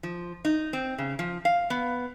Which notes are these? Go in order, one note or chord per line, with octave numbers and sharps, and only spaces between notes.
F3
D#4
C4
C#3
F3
F5
B3